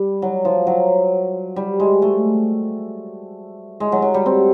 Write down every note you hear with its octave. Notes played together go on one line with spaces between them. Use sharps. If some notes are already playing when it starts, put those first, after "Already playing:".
Already playing: G3
F#3
F3
F#3
G3
G#3
A3
G#3
F#3
F#3
G3
C4